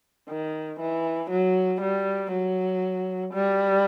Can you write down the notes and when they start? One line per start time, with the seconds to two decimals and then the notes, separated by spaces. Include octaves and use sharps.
0.29 D#3
0.80 E3
1.31 F#3
1.82 G3
2.32 F#3
3.34 G3